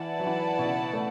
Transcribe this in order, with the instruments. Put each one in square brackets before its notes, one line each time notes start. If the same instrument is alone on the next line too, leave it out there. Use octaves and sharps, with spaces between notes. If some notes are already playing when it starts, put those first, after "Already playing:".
Already playing: [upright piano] E3 [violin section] E4 B4 D5 F#5 A5
[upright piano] F#3
E3
B2
C#3
A3